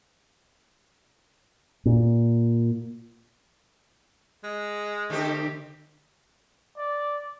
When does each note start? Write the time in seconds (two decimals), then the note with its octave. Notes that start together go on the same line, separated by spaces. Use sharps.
1.86 A#2
4.44 G#3
5.10 D3 A3 C4 G4
6.77 D5